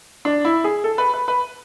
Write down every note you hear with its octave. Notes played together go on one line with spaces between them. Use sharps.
D4
E4
G#4
A4
B4
B4
B4